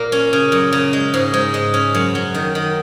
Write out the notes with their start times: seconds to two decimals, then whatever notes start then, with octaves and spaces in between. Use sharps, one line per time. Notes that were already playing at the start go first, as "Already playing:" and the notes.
Already playing: A#2 A#3
0.12 C#4
0.33 C#3
0.52 F#2
0.73 C#3
0.93 G#3
1.14 G#2
1.34 G#2
1.54 G#3
1.74 C#4
1.95 F#2
2.15 F#3
2.34 D#3
2.55 D#3